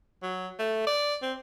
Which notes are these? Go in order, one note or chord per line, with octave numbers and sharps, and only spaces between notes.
F#3
A3
D5
C4